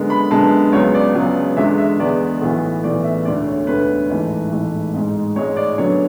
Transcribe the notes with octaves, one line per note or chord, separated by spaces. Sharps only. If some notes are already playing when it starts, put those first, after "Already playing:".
Already playing: F#2 D3 G#3 B3
B5
F#2 D3 G#3 B3 A5
C#2 C#3 F#3 B3 C#5
D5
C#2 C#3 F#3 B3
E2 D3 G#3 B3 E5
E5
E2 D3 G#3 B3 D5
B1 A2 E3 B3
B1 A2 E3 B3 D5
E5
E1 D2 D3 D5
C#5
E1 D2 D3 B4
A1 G#2 E3 A3
A1 G#2 E3 A3
A1 G#2 G#3
A1 G#2 G#3 C#5
D5
F#2 D3 F#3 B3 C#5